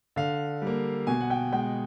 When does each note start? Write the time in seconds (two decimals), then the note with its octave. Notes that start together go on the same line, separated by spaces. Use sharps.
0.16 D3 F5
0.62 G3 A#3
1.07 B2 G#5
1.21 F#5
1.30 G5
1.52 G#3 G5